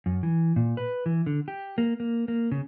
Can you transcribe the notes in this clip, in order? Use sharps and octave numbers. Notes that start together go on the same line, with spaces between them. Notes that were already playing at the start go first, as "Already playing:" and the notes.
F#2
E3
A#2
B4
E3
D3
G4
A#3
A#3
A#3
C#3